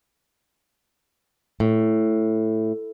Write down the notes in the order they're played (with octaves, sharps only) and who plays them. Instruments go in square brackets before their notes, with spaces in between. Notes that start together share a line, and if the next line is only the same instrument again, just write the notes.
[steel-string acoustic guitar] A2